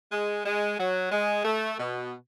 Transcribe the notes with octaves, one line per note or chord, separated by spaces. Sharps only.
G#3
G#3
F#3
G#3
A3
B2